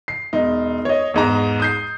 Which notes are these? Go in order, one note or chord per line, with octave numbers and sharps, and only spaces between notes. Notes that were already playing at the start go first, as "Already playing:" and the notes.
C7
E1 D#4
C#5 D#5
E2 G#2 A#5
D#6 G6 C7